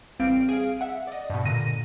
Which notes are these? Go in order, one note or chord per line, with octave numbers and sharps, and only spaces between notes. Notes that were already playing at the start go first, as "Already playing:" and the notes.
A1 G3 C4 F5 D7
G#4 F5
E5 F#5
D5 D#5
G2 B2
A#2 D3 A#6 D#7